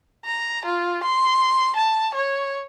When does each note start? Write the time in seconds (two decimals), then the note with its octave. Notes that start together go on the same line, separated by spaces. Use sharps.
0.25 A#5
0.65 F4
1.03 C6
1.76 A5
2.14 C#5